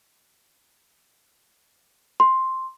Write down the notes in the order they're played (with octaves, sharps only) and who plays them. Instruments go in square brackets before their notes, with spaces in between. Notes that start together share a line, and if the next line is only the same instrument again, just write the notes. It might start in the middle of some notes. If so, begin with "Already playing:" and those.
[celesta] C6